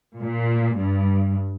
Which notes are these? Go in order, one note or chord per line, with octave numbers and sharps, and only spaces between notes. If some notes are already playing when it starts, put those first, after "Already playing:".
A#2
G2